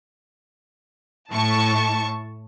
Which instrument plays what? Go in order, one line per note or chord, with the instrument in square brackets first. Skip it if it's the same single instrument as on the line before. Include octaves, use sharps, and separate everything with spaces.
[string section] A2 A5 C#6